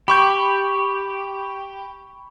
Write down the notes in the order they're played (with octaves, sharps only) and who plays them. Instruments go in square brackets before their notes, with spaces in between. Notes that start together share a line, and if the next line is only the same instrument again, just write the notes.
[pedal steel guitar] G4 [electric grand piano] B5 C#6 G6